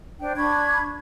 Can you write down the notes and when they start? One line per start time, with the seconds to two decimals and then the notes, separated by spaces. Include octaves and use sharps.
0.21 D4 C5 G5
0.36 D4 B5 C#6 G#6